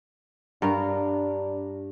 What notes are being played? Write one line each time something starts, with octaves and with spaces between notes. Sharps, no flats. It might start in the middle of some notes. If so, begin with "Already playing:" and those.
G2 D4 A#4 F5